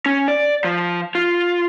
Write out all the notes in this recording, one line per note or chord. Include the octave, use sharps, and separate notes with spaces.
C#4
D5
F3
F4